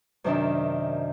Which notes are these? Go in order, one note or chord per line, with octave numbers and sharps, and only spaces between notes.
F#2 C3 D#3 D4 D#4 E5